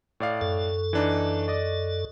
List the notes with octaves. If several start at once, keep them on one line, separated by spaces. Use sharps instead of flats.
A2 D5 F5
F#2 A4
E3 D4 D#4
D5 D#5